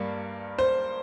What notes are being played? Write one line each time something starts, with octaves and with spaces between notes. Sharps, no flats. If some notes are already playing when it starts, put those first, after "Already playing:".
Already playing: G2 G3 A#3 F5
C5